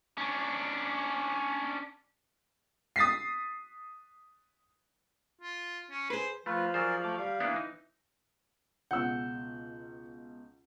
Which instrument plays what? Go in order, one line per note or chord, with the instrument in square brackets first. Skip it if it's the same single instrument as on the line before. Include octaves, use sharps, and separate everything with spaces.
[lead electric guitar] C#4 D4
[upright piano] D#6 A6 B6 C7
[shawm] F4
C#4
[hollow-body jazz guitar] G#4 B4 [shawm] C5
[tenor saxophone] F3 [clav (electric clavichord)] A3 [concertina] F4 B4
[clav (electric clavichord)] F#3 C5 [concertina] G#4 A#4 D5
[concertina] A3 D6
[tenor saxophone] G3 [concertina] F5
[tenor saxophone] E3 [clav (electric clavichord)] A#3 B3 D4
[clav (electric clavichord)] D#4
[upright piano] C#2 B2 [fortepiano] F#5 E6 [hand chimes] G6